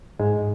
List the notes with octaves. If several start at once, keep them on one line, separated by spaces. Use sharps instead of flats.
G#2 G#3